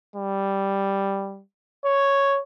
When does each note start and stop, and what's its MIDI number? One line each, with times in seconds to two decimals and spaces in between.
0.16 1.43 55
1.86 2.40 73